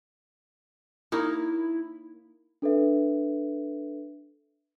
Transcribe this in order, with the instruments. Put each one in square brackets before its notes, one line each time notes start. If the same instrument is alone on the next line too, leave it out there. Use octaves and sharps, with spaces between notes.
[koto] A#3 D#4 C#5 [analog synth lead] E4
[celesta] D4 A4 B4 E5